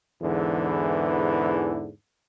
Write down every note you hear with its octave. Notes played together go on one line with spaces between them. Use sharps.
E2 G#2 D3 E3